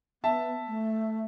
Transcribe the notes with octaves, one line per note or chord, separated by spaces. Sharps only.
B3 E5 A5
A3